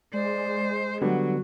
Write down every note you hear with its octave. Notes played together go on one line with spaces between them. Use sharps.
G#3 C5 D5
D3 F#3 G3 B3 F#4